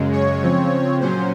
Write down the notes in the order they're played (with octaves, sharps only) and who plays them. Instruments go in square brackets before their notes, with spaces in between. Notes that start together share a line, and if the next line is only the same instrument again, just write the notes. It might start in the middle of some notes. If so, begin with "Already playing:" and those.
Already playing: [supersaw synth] F#2 C#3 G#3
C#5
C#3 F3 C4
A#2 F#3 C#4 C5